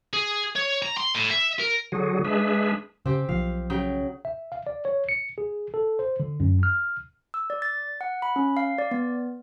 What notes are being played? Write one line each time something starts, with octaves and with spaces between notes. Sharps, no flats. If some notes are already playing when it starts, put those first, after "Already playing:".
G#4
C#5
A#5
C6
A2
E5
A#4
D3 F#3 F#4 G#4
G#3 D4 G#4 B4 E5
C#3 C4 G4
B1 F3 F5
C#3 F#3 G5
E5
F5
D5
C#5
C#7
G#4
A4
C5
D3
F#2
F6
E6
D5
A6
F#5
B5
C#4
F5
D5
B3